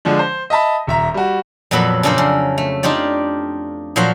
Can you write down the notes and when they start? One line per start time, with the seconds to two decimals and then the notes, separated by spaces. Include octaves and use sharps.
0.05 D3 F3 G#3 D4
0.19 C5
0.50 D#5 E5 A5 B5
0.87 D#1 E5 A#5
1.14 G3 F#4
1.71 F2 A#2 F#3 B3 A4 B5
2.03 C#3 D4 A4 A#4 C5
2.18 C#3
2.58 A3
2.83 D4 D#4 F4 G4 D5
3.96 A#2 F3 F#3 F#4 C5 F5